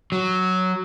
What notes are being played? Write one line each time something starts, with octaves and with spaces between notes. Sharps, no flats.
F#3